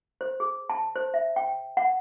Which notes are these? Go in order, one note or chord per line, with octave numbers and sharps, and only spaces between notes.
C5
G#4
A5
C5
E5
G5
F#5